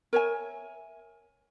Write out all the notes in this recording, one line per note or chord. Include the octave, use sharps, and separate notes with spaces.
A#4 C#5 E5 G#5